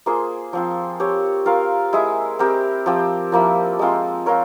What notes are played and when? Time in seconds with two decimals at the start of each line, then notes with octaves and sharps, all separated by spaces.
0.06 A#3 F4 G#4 C5
0.53 F3 C4 F4
1.00 C4 G4 C#5
1.46 C4 F4 A#4 F5
1.93 G#3 E4 G#4 E5
2.39 C4 G4 A#4
2.86 F3 C4 G4
3.32 F3 A#3 E4
3.79 G#3 C4 F4
4.26 C4 F4 A#4 C#5